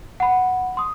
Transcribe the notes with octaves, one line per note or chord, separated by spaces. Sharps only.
F#5 B5
C6 D#6